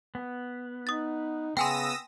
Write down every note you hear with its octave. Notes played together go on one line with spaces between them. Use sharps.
B3
D#4 D#6 A6
C#3 B3 G5 G#5 C6 D#6 E6 A#6